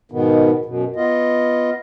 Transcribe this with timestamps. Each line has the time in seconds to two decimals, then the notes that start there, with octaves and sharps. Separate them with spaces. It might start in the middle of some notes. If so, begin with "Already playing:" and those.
0.11 G#2 B2 D#3 B3
0.66 F#2 B2
0.96 B3 F4 D#5